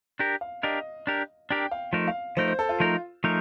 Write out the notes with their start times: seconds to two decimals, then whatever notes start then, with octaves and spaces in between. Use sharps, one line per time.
0.19 D4 G4 A#4
0.41 F5
0.63 D4 G4 A#4 D#5
1.07 D4 G4 A#4
1.51 D4 G4 A#4 G5
1.72 F5
1.93 F3 A3 D#4 A#4
2.08 F5
2.37 F3 A3 D#4 A#4 C5
2.48 C5
2.59 A4
2.69 F4
2.80 F3 A3 D#4 A#4
3.24 F3 A3 D#4 A#4